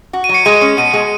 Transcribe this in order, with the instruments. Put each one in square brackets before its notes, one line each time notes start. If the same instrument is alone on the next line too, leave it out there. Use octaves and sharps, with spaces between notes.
[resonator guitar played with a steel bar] F#4
[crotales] D#7
[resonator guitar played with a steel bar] F#3
[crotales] C#7
[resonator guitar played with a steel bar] G#3 [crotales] D#7
[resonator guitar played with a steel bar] C#4 [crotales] C#7
[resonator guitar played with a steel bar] B2 [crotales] D#7
[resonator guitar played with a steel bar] G#3